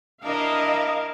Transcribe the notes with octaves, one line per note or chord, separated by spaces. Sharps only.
D4 E4 A#4 D#5 F5